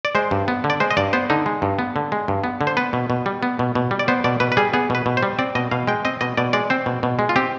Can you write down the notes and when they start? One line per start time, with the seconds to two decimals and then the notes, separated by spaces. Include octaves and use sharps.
0.05 D5
0.15 G#3 C5
0.31 G2
0.48 B3
0.64 D3
0.70 D5
0.80 G#3 C5
0.91 D#5
0.97 G2 D5
1.13 B3 C5
1.30 D3 D#4
1.46 G#3
1.62 G2
1.79 B3
1.96 D3
2.12 G#3
2.28 G2
2.44 B3
2.61 D3
2.67 C5
2.77 B3 B4
2.93 B2
3.10 B2
3.26 G3
3.43 B3
3.59 B2
3.75 B2
3.91 G3
3.99 D5
4.08 B3 C5
4.24 B2 D5
4.40 B2 B4
4.52 B4
4.57 G3 G#4
4.74 B3 G#4
4.90 B2 B4
5.06 B2
5.17 C5
5.23 G3
5.39 C4 D5
5.55 B2 D#5
5.71 B2 F5
5.87 G#3 G5
6.05 C4 D#5
6.21 B2 D#5
6.37 B2 D5
6.53 G#3 D5
6.70 C4 C5
6.86 B2
7.03 B2
7.19 G#3
7.29 F4
7.36 C4 G4